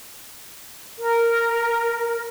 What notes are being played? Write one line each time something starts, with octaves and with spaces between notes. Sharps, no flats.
A#4